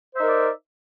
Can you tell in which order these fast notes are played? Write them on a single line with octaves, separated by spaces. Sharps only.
C5 E5 D#4 A#4 D5